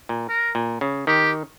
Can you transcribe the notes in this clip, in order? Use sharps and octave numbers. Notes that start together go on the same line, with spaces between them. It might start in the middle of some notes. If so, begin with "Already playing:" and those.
A#2
A#4
A#2
C#3
D#3 G4